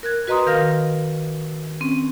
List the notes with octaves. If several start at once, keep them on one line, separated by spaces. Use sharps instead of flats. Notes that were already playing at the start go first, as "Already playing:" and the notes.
A#4 F#6 G#6
F#4 B4 D#5 A#5 C6 D#6
D#3 A#4 F5 F6 A#6
C4 C#4